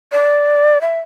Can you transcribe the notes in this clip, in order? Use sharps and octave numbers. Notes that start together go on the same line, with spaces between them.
D5
E5